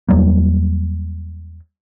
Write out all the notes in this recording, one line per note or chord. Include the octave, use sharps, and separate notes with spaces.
E2 F#3 G3 A#3